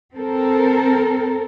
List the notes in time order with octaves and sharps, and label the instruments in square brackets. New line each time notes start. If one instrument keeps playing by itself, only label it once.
[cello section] C4 A4 A#4